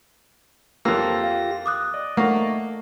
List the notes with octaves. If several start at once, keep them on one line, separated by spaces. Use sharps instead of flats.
F2 A#3 F4 G4 E6 A#6
F5
D6 D#6 F#6
D5 D#5
A3 A#3 F#5 C#6